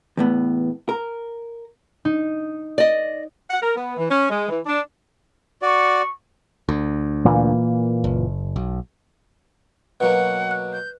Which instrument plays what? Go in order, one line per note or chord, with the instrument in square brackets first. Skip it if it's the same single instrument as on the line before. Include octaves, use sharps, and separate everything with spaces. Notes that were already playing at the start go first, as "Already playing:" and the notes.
[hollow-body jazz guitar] E2 A2 B3
A#4
[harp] D#4
[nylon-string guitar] D5 D#5
[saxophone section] F#5
A#4
B3
E3
C#4
G#3
E3
D4
[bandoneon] F#4 D5 [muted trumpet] C#6
[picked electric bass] D2
[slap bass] A#2 E3 A#3
[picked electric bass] F#1
B1
[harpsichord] B2 F#3 A#3 [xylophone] B4 [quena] F#5
[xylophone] F#6
[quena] G6